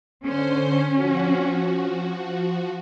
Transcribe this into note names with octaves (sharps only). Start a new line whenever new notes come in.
D3 C#4 C5 C6
F3 F#4